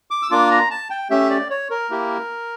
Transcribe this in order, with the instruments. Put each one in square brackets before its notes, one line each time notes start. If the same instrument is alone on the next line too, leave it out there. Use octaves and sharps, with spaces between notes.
[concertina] D6
E6
A#3 D4 F4 D6
A#5
A5
G5
A3 C#4 G4 E5
D5
C#5
A#4
A#3 E4 G4